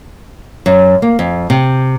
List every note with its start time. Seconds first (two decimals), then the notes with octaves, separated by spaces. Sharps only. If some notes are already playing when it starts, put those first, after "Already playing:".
0.66 F#2
1.02 A#3
1.19 F2
1.50 C3